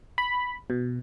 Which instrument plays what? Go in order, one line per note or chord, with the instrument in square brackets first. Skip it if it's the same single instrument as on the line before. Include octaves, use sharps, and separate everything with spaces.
[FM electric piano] B5
B2